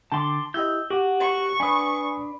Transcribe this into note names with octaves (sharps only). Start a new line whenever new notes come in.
D3 G5 A5 C6 D6 A6
E4 G4 D#5 E6 G6
F#4 G4 D6
C#6
D4 B4 G#5 B5 D#6